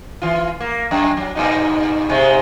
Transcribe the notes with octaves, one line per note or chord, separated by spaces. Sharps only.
E3 F4
A#3
F#2
F#3
G2 B2 D#4
G#2 C3 G#3